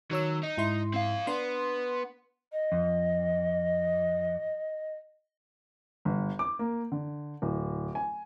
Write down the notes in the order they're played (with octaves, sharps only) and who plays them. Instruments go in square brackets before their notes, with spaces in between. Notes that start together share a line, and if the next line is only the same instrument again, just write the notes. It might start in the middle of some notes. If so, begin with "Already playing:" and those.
[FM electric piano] D#3 C#5 E6 [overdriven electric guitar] F#3
[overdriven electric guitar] D#4
[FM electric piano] G#2 E4 C6
[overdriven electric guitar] C4 F5
[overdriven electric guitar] B3 [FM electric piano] D4 C6
[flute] D#5
[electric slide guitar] F2
[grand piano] G1
D6
A#3
D3
D1
G#5